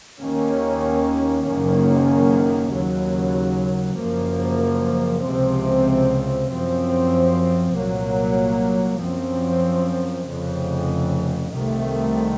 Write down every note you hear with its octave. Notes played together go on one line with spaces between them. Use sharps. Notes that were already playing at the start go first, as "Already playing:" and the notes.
D#2 D#3 A#3 C#4
F#1 F#2 D#3 A#3 C#4
D#2 C#3 F#3
F#1 F#2 F3 A#3
C#2 C3 F3 C4
F#2 F3 C4
C2 A#2 F#3 A#3
F#2 F3 C4
F1 F2 C#3
C2 C3 D#3 A3